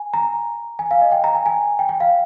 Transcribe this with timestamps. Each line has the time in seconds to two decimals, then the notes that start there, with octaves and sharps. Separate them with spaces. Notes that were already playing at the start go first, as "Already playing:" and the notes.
Already playing: G#5
0.14 A#5
0.79 G#5
0.91 F5
1.01 D#5
1.12 G5
1.24 A#5
1.35 G#5
1.46 G#5
1.79 G5
1.89 G5
2.00 F5